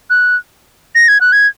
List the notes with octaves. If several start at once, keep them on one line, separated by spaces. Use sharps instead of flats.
F#6
A#6
G#6
F#6
G#6